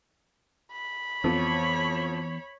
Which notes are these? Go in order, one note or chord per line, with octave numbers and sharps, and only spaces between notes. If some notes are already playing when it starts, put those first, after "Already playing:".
B5
F2 E3 B3 C#5